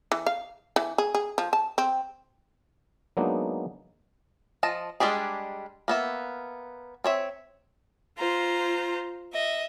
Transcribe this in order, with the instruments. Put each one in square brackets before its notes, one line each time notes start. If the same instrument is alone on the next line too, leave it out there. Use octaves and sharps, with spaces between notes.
[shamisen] E3
F5
E3
G#4
G#4
F3
A5
C4
[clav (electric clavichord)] F#3 G#3 A#3 B3 D4 D#4
[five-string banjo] F3 D#5 A5
G3 G#3 D4 G4 G#4
A#3 B3 E5
C4 C#5 E5
[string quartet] F4 C5 A#5
D#5 E5